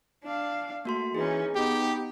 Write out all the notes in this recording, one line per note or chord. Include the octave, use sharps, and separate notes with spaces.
D4 F5
A3 A#3 F#4 C6
E3 C#4 D#4 G#4
B3 D#4 G4